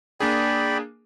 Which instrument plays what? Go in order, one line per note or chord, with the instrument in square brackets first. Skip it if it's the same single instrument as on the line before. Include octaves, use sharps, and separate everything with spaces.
[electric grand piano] A#3 D4 G#4 [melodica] D5 G5 B5